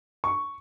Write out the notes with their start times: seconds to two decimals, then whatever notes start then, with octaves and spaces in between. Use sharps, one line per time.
0.24 C#6